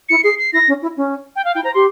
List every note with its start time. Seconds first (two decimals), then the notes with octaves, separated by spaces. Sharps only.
0.09 E4 C#7
0.23 G#4 C7
0.39 C7
0.52 E4 A#6
0.67 C#4
0.82 E4
0.97 C#4
1.36 G5
1.45 F5
1.55 E4 G5
1.64 C5 A#5
1.74 G4 C6